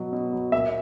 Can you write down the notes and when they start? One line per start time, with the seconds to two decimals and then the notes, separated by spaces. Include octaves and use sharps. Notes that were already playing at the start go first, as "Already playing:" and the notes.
Already playing: B2 F#3
0.13 B2
0.33 F#3
0.52 A#2 E5